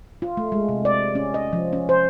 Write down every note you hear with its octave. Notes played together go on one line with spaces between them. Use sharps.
F4
A3
G#3
C3
D5
C#4
D#5
F3
C#4
C5